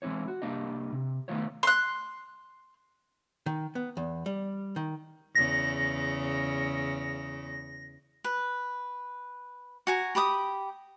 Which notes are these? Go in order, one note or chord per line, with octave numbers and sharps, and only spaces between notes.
E3 G#3 C4 E4 C#5
F#4
C2 D#3 G3 A#3 D4 D#5
C3
D#3 A3 B3 F4 C5 C#5
C6 F#6
D#3
B3
E2
G3
D#3
E2 C#3 A#6
B4
F#4 G#5 A#5
G4 B5 D6 D#6